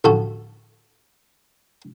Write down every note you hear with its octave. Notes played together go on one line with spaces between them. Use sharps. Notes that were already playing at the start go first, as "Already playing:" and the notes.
A1 D2 F3 F#4 A4 C#6